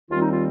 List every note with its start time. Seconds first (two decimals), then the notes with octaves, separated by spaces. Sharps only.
0.10 D#2 D#3 G3 C4 F4
0.21 D#4
0.32 F4